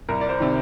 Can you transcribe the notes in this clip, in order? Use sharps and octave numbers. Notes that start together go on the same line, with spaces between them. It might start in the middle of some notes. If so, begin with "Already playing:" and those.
C2 A#4
D5
C5
C3 D#3